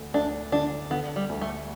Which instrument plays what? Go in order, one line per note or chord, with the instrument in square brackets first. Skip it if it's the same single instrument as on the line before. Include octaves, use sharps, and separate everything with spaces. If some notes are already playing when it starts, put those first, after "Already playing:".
Already playing: [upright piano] D2 D3
[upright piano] D2 [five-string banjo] D4
[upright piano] D3 [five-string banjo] D4
[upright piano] D3 [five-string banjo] B3
[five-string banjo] G3
[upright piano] D2
[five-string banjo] A3